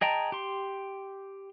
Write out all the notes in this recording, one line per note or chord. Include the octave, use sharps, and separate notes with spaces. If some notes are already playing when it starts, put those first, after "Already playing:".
G#4 D#5 G5 A5 A#5
G4 C6